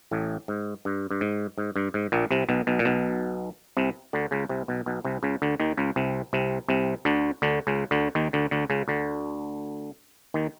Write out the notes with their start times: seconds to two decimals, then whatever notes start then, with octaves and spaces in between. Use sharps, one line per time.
0.11 A1 A2
0.48 G#2
0.85 G2
1.11 G2
1.21 G#2
1.58 G#2
1.76 G2
1.94 G#2
2.12 A#1 A#2
2.31 C2 C3
2.49 B1 B2
2.67 B1 B2
2.79 A#2
2.85 B1 B2
3.77 C2 C3
4.13 D2 D3
4.31 C#2 C#3
4.49 C2 C3
4.68 B1 B2
4.86 B1 B2
5.05 C2 C3
5.23 C#2 C#3
5.42 D2 D3
5.60 D#2 D#3
5.77 C#2 C#3
5.96 C2 C3
6.33 C2 C3
6.69 C2 C3
7.05 D2 D3
7.42 D2 D3
7.67 C#2 C#3
7.91 D2 D3
8.15 D#2 D#3
8.33 D2 D3
8.51 D2 D3
8.70 C#2 C#3
8.88 D2 D3
10.34 D#2 D#3